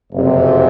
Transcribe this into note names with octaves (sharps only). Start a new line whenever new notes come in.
F#1 F2 C3